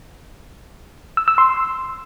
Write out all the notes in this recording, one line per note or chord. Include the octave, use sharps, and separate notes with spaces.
E6
E6
C6